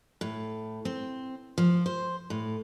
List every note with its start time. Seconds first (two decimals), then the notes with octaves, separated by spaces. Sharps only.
0.21 A2
0.85 C4
1.58 F3
1.86 C5
2.30 A2